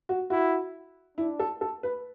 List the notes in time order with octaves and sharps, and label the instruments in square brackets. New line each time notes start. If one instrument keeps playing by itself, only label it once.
[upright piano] F#4
[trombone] E4 [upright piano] F#4
[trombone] D4 [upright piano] E4
[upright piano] A4
A4
B4